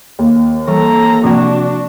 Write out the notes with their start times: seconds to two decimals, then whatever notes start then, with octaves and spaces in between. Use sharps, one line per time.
0.19 D#2
0.68 E3 G3 A4 A#5
1.24 C3 F3 A#3 D4 F#4